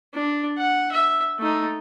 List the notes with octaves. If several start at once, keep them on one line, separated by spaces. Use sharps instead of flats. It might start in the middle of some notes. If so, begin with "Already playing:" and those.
D4
F#5
E5
A3 D#4